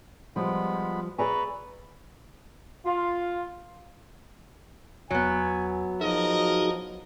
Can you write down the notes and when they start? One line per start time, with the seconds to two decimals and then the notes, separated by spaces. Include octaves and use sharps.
0.36 F3 G3 G#3 B3 B5
1.18 G#4 B4 D5 E5 G#5 A#5 C#6
2.86 F4
5.11 E2 F#3 B3 G#5
6.01 F3 D#4 F#4 G#4 A#4 D#5